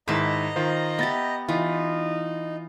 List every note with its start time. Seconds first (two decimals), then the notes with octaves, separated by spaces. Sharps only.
0.08 G#2 D#3 E4 B4 D#5 A5 A#5
0.56 D#3 F4 C5
0.99 B3 G4 E5 A6 A#6
1.49 E3 D#4 F4